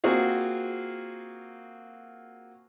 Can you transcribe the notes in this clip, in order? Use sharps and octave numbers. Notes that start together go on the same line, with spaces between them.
A#3 C4 F4 F#4 G#4